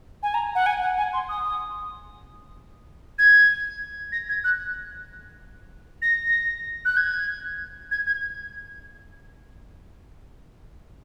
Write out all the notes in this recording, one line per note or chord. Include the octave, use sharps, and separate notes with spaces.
G#5
A#5
F#5
G#5
F#5
G#5
C6
D#6
G#6
A#6
G#6
F#6
A#6
A#6
F#6
G#6
G#6
G#6